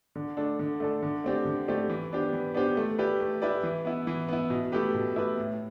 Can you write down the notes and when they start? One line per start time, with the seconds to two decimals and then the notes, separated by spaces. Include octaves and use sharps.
0.16 D3
0.37 A3 D4 A4
0.59 D3
0.80 A3 D4 A4
1.03 D3
1.24 A3 C4 G4 D5
1.45 D3
1.68 A3 C4 G4 D5
1.89 E3
2.11 B3 D4 G4 C5
2.33 E3
2.54 B3 D4 G4 C5
2.77 A3
2.98 E4 G4 B4 D5
3.20 A3
3.42 E4 G4 B4 D5
3.63 E3
3.85 B3 E4
4.07 E3
4.28 B3 E4
4.50 B2
4.72 A3 E4 G4 B4
4.94 B2
5.16 A3 E4 G4 B4
5.37 A2